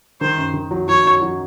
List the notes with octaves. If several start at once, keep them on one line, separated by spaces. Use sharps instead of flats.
D#3 C5
F#2
D#3
F#3
F#3 C#5
F#3
F#3